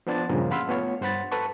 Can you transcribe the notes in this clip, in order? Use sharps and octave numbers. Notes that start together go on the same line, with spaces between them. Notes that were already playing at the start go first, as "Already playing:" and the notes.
F3 B3 D4 C5 A6
G2 A#2 C#3 F3 A#3
F5 F#5 B5 C6 E6 F6
A3 B3 F4 C#5
G2 C5 F#5 B5 A6
A4 B4 A5 C#6